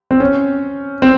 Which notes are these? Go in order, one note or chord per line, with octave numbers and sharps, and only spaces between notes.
C4
C#4
C4